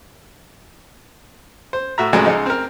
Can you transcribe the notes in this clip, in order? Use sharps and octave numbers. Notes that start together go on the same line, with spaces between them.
C5
A2 F#4 E5 A#5
D2 A2 C#3 F#3 G#3 C4
C#2 G#3 D#4
C4 A#4